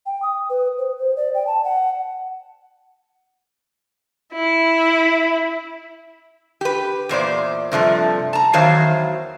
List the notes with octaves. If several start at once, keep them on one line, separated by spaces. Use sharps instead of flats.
G5
D#6
B4
C5
C5
D5
G5
A5
F#5
E4
G4 B4
E2 A#2 C5 D5
G2 C3 F3 A3
A5 A#5
E2 D#3 F#3 C5 F5